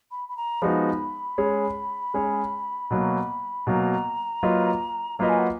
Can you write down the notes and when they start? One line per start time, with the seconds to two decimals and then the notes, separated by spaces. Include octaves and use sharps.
0.11 B5
0.28 B5
0.36 A#5
0.61 F3 G#3 B3 D#4 F#4 B5
1.38 G#3 C#4 G#4 C#5
2.14 G#3 C#4 G#4 C#5
2.91 B2 F#3 A#3
3.67 B2 F#3 A#3 A#5
4.43 F#3 A#3 F4 B4 D#5
5.18 F#3 A#3 F4 B4 D#5 A#5
5.29 G#5
5.38 F#5